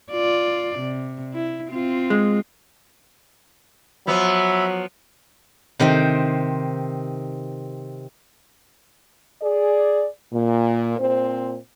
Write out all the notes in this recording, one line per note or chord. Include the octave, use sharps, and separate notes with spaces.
F4 D5
C3
E4
C4 F4
G#3
F3 F#3 B3 B4 E5 B5
C3 D#3 C4 C5
G#4 D5
A#2
A#2 C4 C5